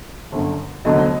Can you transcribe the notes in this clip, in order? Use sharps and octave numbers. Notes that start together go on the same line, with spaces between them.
G1 F#2 D3
F1 D#2 D3 F#3 B3 D#5